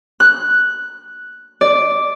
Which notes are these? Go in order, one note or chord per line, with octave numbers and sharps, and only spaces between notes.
F#6
D5